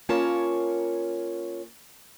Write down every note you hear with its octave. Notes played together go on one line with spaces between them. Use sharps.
A#3 C#4 F4 A#4 C#5 A5